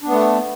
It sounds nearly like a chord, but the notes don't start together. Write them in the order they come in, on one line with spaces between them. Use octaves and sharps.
D4 B3 A3